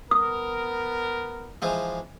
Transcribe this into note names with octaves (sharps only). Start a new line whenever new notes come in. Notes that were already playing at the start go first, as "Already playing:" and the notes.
B3 A#4 D#6
E3 F3 G#3